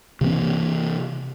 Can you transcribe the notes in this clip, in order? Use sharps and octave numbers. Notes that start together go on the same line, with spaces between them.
C3 E3 A#3 C4